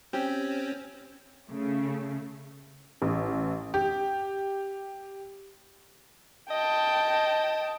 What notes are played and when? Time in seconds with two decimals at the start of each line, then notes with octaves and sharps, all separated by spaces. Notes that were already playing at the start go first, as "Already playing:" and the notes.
0.13 C4 C#4 G4
1.51 C#3 A3
3.02 A1
3.74 G4
6.51 D#5 G5 A5